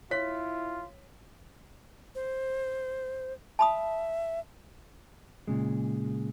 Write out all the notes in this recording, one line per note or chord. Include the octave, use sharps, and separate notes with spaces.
E4 F4 C#5 B6
C5
E5 A5 B5 D#6
A#2 C#3 G#3